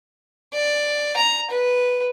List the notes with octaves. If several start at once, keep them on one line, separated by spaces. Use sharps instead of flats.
D5
A#5
B4